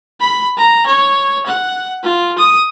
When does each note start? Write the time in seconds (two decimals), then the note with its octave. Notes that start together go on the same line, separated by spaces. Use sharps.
0.20 B5
0.57 A#5
0.86 C#5
1.46 F#5
2.03 F4
2.38 D#6